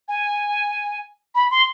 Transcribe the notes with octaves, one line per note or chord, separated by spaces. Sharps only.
G#5
B5
C6